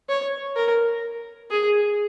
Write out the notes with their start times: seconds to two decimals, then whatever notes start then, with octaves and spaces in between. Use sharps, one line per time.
0.09 C#5
0.56 A#4
1.51 G#4